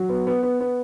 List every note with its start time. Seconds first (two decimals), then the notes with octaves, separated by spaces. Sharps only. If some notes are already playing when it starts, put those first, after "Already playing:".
Already playing: F#3
0.09 B3
0.27 B3
0.43 B3
0.60 B3